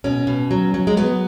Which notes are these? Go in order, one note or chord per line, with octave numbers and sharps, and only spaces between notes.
B2 C#4
B2
F#3
F#3
G#3
F#3 B3